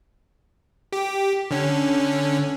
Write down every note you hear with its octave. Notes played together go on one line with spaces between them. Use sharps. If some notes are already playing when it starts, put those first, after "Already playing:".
G4
D3 C#4